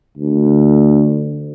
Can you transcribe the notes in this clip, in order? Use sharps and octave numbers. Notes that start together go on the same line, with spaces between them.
D2